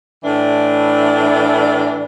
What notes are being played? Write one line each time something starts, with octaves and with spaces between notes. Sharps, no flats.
A2 E3 D4